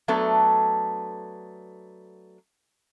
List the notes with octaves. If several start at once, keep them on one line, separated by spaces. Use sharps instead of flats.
F#3 A3 B3 D4 A4